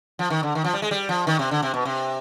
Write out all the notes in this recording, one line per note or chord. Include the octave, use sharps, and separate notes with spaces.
F3
D#3
D3
D#3
F3
G3
G#3
G3
F3
D#3
C3
D3
C3
B2
C3